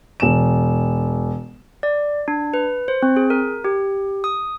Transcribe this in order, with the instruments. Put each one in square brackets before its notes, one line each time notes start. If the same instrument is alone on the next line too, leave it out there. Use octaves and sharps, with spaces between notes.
[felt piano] E1 E7
[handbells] D5
D4
B4
C5
C4
G#4
A#4
G4
D#6